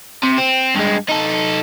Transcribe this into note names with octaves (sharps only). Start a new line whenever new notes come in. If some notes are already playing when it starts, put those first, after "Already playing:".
C3
C4
G2 G#3
D#4 A4